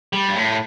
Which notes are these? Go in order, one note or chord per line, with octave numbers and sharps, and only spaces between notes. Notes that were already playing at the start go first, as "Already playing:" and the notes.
G3
G2
A2